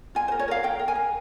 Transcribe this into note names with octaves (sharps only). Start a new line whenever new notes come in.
F4 G#5
C5
A#4
C#5
A#4 F5
A#4 G5
A#4
G#5
A#4